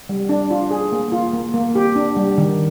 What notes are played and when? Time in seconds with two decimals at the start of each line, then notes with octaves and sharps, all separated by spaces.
0.09 G3
0.29 D4
0.51 F4
0.71 G#4
0.92 A#3
1.12 F4
1.33 A#3
1.54 A#3
1.75 G4
1.96 D4
2.16 G3
2.38 D#3